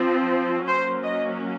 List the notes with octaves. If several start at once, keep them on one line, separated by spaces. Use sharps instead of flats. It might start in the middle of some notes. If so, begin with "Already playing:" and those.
Already playing: F3 C4
F#3 A#3 C#4 C5
D#5